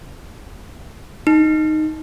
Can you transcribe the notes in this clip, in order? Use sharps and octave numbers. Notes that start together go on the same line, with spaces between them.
D#4